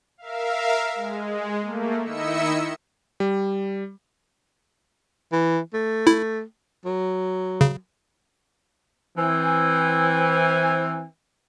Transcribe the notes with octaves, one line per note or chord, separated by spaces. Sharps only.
A#4 E5 F5
G#3
A3 A#3
D#3 E4 D#5 E5 E6 C#7
G3
E3
A3
E4
F#3
C#3
E3 C4 G#5